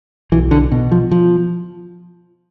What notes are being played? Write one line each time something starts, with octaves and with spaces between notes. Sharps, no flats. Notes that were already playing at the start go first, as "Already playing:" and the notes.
B1 E3
D3
B2
F3
F3